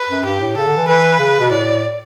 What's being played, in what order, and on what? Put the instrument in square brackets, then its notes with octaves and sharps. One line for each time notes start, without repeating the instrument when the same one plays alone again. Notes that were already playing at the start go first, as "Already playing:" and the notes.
Already playing: [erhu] B4
[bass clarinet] F#2
[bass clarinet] G2 [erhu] G4
[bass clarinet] A2
[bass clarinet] C#3 [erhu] A4
[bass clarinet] D3
E3
[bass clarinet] E3 [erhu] B4
[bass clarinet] C#3
B2
[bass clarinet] A2 [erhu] D5